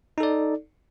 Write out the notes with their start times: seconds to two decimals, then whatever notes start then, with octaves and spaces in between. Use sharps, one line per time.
0.18 D#4
0.20 A4
0.23 D5